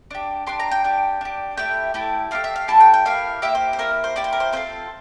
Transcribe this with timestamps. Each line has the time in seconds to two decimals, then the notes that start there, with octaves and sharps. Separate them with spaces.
0.11 D4 G4
0.47 D4 G4 C6
0.60 A#5
0.71 G5
0.84 D4 G4
1.21 D4 G4
1.57 A3 E4 G4 G5
1.94 A3 E4 G4
2.31 A3 E4 G4 F5
2.44 E5
2.56 F5
2.68 A3 E4 G4 A5
2.80 G5
2.94 G5
3.05 A#3 E4 G4 F5
3.42 A#3 E4 G4 E5
3.55 C5
3.73 C5
3.79 A#3 E4 G4 A#4
4.04 C5
4.16 A#3 E4 G4 D5
4.24 C5
4.33 A#4
4.40 C5
4.53 C4 F4 A4 C5